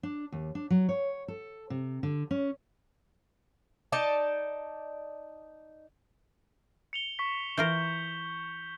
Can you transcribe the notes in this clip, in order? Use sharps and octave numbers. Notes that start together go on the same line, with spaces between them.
D4
D#2
D4
F#3
C#5
A4
C3
D3
C#4
D#4 D5 A5
C#7 F7 G7
C#6 B6
E3 F4 A#4 G6 G7